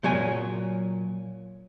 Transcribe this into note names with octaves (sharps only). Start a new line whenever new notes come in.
A#2 F#3 C#5 G#5